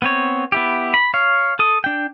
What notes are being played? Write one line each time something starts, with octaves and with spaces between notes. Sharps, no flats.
B3 C4 C#5
B3 E4 G4
B5
C#5 F5
A4 D#6
D4 G5